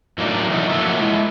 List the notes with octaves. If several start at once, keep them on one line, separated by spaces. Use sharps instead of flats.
A2 F#3 A#3 D4 D#4
E3 F#3 D#4 A4
F3 F#3 A3 A#3 F#4 E5
G#3 E4